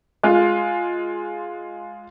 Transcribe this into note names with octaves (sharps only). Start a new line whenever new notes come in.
G#3 F4